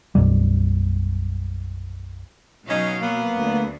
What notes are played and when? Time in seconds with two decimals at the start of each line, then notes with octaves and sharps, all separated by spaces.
0.15 B1 F#2 B2 G3
2.68 B2 F#3 C#4 D#4 F5
3.00 A#3 B3
3.35 D2